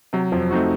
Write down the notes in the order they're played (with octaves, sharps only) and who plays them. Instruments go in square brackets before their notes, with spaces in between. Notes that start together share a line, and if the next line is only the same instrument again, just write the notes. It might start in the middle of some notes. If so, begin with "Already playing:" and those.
[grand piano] C3 [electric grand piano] F#3
[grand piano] F2 F3
[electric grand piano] A3 C4 D#4 F#4